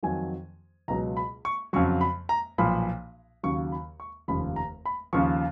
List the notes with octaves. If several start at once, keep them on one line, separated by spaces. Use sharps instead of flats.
F2 D#3 F#3 G#5
C#2 B2 F#3 A#5
B5
C#6
F2 C#3 F#3 C#6
B5
A#5
B1 A#2 F3 B5
D#2 C#3 F#3 C#6
B5
C#6
F1 D#2 C#3 F3 B5
A#5
B5
D#2 C#3 F3 C#6